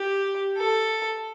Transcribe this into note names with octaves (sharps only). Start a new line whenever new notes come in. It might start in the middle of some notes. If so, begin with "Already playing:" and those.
Already playing: G4
A4